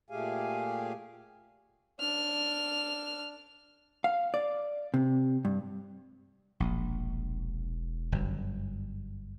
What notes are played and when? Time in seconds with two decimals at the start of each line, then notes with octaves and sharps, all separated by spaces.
0.10 A#2 A3 G4 G#4 F5 G#5
2.00 D4 F6
4.04 F5
4.34 D5
4.94 C3
5.45 G2
6.60 E1 A#1
8.12 G1 F#2